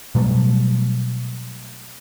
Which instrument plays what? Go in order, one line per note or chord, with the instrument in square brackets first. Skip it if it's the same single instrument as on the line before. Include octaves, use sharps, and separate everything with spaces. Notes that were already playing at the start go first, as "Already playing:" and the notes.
[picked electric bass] B2 F#3 G3 A3